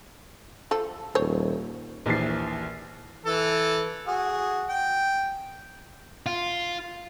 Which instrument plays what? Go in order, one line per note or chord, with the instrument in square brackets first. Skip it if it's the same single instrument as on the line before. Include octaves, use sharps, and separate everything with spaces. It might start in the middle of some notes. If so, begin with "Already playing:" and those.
[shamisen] F3 A4
[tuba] D#1 [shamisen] C5 C#5
[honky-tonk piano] A#1 D#2 E3 A6 C7
[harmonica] E3 A4
F#4 G#4
G5
[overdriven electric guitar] F4